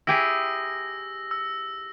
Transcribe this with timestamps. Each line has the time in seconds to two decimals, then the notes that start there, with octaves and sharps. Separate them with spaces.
0.07 E4 G4 G#4 E6 A#6
1.31 E6